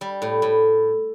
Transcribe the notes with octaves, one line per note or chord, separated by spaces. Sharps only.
G3
A2
A2